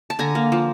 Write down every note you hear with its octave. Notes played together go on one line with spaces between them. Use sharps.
A5
D3 G#5 A#5
A#3
F3